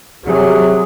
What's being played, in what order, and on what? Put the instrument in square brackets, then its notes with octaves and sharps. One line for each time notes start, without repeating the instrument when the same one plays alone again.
[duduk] C3 [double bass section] F#3 [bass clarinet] G#4